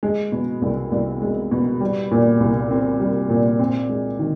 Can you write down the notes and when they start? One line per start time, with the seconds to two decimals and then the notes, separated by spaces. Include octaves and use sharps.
0.03 G#3
0.32 B2
0.62 C2
0.92 C2
1.22 G#3
1.51 B2
1.80 G3
2.11 A#2
2.40 C2
2.71 C4
3.00 G3
3.30 A#2
3.59 C4
3.89 G#3
4.19 D#3